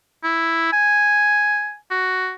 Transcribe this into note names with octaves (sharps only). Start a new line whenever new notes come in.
E4
G#5
F#4